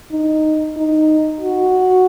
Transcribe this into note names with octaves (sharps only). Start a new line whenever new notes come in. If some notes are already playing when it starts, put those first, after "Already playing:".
D#4
D#4
F#4